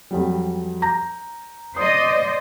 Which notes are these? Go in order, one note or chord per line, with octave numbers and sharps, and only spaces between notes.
F2 F#3 G3
A#5 G6 A#6
C5 D5 D#5 D#6